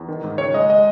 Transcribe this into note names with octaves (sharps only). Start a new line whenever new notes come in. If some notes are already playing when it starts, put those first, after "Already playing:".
Already playing: E2
D#3
G#2
C#2 C#5
G#3 D#5
G#3 D#5